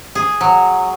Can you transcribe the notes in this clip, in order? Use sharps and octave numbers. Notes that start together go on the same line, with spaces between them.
G#4
F#3